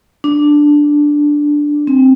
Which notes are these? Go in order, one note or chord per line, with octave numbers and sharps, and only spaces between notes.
D4
C4